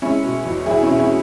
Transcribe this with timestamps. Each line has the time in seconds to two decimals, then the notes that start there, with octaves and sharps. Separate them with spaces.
0.02 G#3 C#4 E4
0.23 B2
0.45 E2
0.66 E2 E4 G#4
0.83 C#4 E4
0.88 B2
0.99 C#4 E4